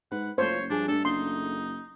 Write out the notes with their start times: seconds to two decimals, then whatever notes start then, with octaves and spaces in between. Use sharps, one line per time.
0.12 G#2 B4 F#5
0.38 F#1 A3 C#4 F4 C5 C#5
0.70 G2 F3 D4 G#4
0.88 A3 D4 A4
1.05 F#1 D#4 C6